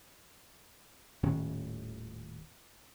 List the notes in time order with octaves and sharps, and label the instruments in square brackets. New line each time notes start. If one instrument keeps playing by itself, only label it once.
[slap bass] D#1 A2 D#3 C#4